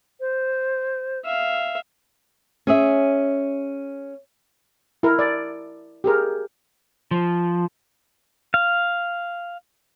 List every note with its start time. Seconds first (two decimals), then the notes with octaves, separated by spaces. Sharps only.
0.20 C5
1.25 E5 F5
2.67 C#4 G#4 E5
5.03 E4 A#4
5.19 D5
6.04 G4 G#4 A#4
7.11 F3
8.54 F5